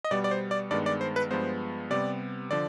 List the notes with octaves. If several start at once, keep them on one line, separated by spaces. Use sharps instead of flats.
D#5
B2 G3 B3 D5
D5
C5
D5
G2 D#3 G#3 B3 D5
D5
C5
B4
G2 F3 G#3 B3 C5
C3 G3 B3 D5
D3 F3 D5